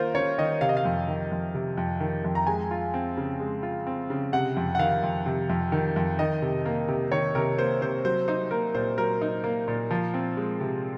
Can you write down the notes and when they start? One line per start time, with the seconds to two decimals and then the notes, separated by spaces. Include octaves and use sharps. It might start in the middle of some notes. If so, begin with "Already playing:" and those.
Already playing: D#3 A#3 F4 A#4 C5
0.15 C#4 C#5
0.38 D#3 D#5
0.61 C3 F5
0.69 D#5
0.77 F5
0.85 F2
1.08 D#3
1.31 F2
1.54 C3
1.77 F2
2.00 D#3
2.24 F2
2.35 A#5
2.47 G#3 G#5
2.71 F4
2.94 C4
3.17 C#3
3.40 G#3
3.63 F4
3.87 C4
4.10 C#3
4.33 C3 F#5
4.56 F2
4.75 F#5
4.79 D#3 F5
5.03 F2
5.26 C3
5.49 F2
5.72 D#3
5.96 F2
6.19 D#3 D#5
6.42 C3
6.66 A#3
6.88 C3
7.12 D#3 C#5
7.35 C3 A#4
7.58 A#3 C5
7.82 C3 C5
8.05 F#3 C5
8.28 D#4 C5
8.51 A#3 A#4
8.75 A#2 C5
8.98 F#3 A#4
9.22 D#4
9.44 A#3
9.68 A#2
9.91 F3
10.14 C4
10.37 G#3
10.60 C3